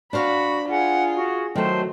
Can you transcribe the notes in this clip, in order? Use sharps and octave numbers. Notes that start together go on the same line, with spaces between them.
D4 F#4 C5 F5 B5
F4 G#4 F#5
F#4
D#3 F#3 A3 A4 C5